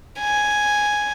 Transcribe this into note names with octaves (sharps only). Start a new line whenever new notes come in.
G#5